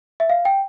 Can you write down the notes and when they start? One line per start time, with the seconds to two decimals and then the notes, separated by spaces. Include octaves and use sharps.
0.20 E5
0.29 F5
0.45 G5